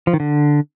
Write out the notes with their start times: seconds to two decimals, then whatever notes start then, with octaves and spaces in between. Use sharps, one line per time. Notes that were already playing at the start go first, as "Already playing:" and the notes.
0.07 F3
0.13 D#3
0.20 D3